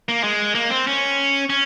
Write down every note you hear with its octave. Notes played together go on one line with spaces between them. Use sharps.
A#3
G#3
A#3
C4
C#4
C#4